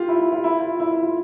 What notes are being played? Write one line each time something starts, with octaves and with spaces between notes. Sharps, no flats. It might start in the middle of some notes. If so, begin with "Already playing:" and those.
Already playing: F4 G4
E4
E4
F4
E4
F4
E4
E4
F4